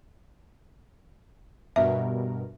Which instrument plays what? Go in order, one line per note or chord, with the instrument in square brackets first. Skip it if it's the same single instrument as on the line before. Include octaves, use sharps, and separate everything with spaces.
[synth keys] G2 B2 A#4 [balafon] E5